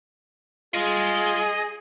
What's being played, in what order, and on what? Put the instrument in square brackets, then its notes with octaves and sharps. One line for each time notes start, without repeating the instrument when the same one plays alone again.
[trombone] F4 [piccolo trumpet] G#4 [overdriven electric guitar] D#5 C6